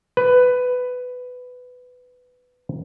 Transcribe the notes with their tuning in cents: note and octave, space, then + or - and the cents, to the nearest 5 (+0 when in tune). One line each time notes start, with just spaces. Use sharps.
B4 +15